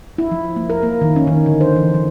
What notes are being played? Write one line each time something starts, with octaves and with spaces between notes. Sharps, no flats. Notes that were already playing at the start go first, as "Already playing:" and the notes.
E4
F3
A#3
A#4
A#3
D#3
C#4
D#3
D3
C5
E3
F3